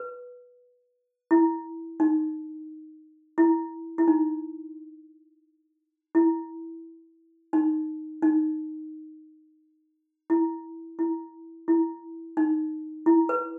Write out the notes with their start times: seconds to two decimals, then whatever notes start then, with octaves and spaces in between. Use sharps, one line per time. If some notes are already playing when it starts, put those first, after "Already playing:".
Already playing: B4
1.31 E4
2.00 D#4
3.38 E4
3.98 E4
4.08 D#4
6.15 E4
7.53 D#4
8.22 D#4
10.30 E4
10.99 E4
11.68 E4
12.37 D#4
13.06 E4
13.29 B4